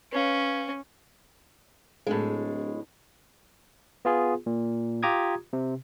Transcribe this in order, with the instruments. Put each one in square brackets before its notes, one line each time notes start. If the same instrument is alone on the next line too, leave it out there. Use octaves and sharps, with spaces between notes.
[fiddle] C#4 [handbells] B4 C#5 F5
[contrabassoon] D1 [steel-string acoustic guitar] A2 G#3
[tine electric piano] B3 F4 G#4
A#2
F4 G4 A#5 D6 D#6 G#6
C3